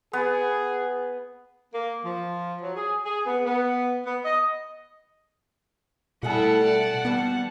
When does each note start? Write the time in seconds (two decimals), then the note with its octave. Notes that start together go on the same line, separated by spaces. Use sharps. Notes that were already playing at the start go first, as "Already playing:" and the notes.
0.13 B3 G#4
1.74 A#3
2.06 F3
2.62 F#3
2.76 G#4
3.06 G#4
3.26 B3
3.46 B3
4.06 B3
4.25 D#5
6.23 B2 G3 A3 E4 G#4 A4 F#5 A5
6.64 D5
7.05 D#2 G3 B3 D4 F#4